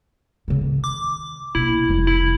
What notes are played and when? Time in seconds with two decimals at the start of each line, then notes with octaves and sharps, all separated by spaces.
0.48 C#3 B3
0.61 D#3
0.84 D6
1.55 A#1 B2 E4
1.89 F1 G3
2.07 E4